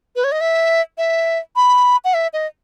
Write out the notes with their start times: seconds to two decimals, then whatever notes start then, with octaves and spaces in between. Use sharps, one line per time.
0.16 B4
0.24 C#5
0.32 D#5
0.41 E5
0.98 E5
1.56 B5
2.05 F#5
2.14 E5
2.33 D#5